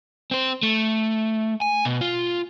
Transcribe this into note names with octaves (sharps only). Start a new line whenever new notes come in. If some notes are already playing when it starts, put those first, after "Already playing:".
C4 C5
A3
G#5
B2
F4